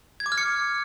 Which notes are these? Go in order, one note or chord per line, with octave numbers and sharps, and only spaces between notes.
G#6
D6
F6
C#7